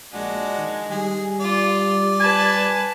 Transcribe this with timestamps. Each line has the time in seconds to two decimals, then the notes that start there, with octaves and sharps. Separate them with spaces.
0.13 A#1 G#3 D4 F#4
0.58 D#3
0.90 G3 G#4
1.41 F4 D5
2.20 B4 G#5 A5